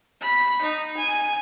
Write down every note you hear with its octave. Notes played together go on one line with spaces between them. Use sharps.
B5
D#4
G#5